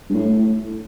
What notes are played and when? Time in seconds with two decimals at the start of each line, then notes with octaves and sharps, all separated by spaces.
0.10 G2
0.14 A2